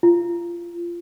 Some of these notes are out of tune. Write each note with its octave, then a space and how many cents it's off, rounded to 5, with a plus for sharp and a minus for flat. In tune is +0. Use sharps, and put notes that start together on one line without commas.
F4 -20